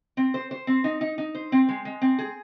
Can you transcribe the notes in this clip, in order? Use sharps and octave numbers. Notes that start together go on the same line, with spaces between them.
C4
C5
C5
C4
D#4
D#4
D#4
C5
C4
G#3
G#3
C4
G#4